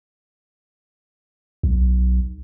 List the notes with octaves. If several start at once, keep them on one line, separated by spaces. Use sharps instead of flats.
B1